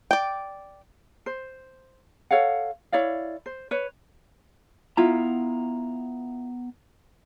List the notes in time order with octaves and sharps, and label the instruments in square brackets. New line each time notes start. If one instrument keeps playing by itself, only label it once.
[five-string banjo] D5 G5
[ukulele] C5
A4 C#5 F5 F#5
E4 C#5 D5 F5
C5
B4 C#5
[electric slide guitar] B3 A#5 [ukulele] E4 F4